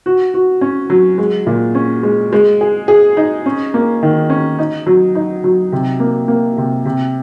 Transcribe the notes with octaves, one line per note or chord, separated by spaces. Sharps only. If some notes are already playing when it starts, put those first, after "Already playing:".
F#4
F#4
C#4
F#3
G#3
A#2
C#4
G#3
G#3
G#4
G#4
D#4
C#4
A#3
D#3
C#4
D#4
F#3
D#4
F#3
C3
A#3
A#3
C3
C3